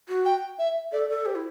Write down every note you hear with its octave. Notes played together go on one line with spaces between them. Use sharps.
F#4
G5
E5
A4 D5
A4 D5
G4 C5
E4